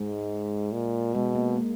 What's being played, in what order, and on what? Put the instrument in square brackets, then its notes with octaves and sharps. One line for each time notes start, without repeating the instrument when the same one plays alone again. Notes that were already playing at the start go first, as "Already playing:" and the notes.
Already playing: [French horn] G#2 [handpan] G#3
[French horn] A#2
[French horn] B2 [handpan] G#3
[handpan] A#3
A#3